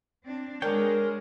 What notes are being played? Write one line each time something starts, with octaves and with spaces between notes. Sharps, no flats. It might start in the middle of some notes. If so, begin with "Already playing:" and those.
C4 D4
G#3 D4 G#4 A#4 C#5 G5